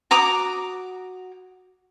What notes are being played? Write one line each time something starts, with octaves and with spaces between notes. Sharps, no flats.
F#4 A#5 D6 D#6